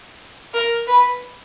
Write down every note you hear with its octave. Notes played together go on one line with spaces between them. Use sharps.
A#4
B4